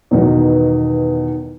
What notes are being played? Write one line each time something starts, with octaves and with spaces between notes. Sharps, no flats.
E2 B2 D#3